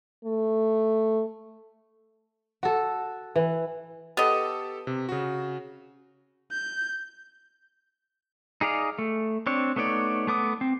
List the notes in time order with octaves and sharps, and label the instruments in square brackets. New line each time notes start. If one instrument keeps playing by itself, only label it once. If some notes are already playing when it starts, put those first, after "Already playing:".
[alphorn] A3
[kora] F#4 A4
E3
[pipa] B3 D#5 [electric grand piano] G4 A4
[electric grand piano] C3
C#3 F#4
[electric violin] G6
[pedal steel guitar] D#4 G#4 D5 F5
A3
C4 D4 C#5
A3 B3 D#4 C#5 D5
A3 B3 D6 D#6
C4